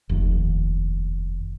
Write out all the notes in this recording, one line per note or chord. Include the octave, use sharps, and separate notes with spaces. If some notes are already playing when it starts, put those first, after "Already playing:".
F1 D#2